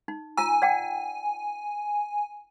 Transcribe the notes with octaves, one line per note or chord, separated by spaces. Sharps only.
D#4
F4 G#5 A#5 E6
D5 F#5 G5